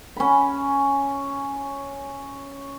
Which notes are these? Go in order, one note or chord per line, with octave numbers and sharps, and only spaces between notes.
C#4 B5